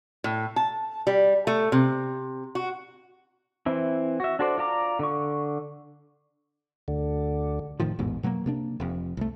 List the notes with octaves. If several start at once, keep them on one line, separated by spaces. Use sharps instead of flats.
A2
A5
G3
A3
C3
F#4
E3 C4 E4
F#4 E5
D4 F#4 A4 C5 D5
F4 D5 A#5 D6
D3 C#6
D2 D3
F1 A2 D#3 F3
A1 E2 G#2 B2
B2 F#3 G#3 A#3
C3 A#3 D4
F1 F2
C2 A3